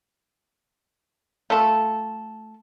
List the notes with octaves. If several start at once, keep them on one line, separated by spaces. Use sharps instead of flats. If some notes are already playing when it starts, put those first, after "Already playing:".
A3 F4 A4